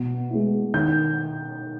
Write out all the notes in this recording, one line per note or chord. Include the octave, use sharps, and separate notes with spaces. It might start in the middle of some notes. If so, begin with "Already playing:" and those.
Already playing: B2
G#3 B3 E4
D#3 G6